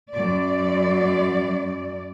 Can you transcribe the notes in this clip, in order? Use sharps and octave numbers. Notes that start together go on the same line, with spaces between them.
F#2 D5